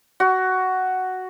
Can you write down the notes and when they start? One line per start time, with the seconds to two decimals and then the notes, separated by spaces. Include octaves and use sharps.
0.20 F#4